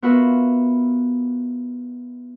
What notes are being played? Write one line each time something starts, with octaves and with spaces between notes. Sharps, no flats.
B3 F4 F#4 A#4 B4 E5